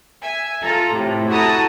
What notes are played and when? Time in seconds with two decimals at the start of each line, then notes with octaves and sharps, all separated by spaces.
0.22 E5 G#5
0.63 F4 A4 A#5
0.91 A2 C3
1.29 E4 F#4 A4 A5 A#5 D#6